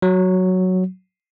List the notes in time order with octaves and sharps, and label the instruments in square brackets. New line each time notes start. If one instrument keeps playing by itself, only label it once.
[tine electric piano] F#3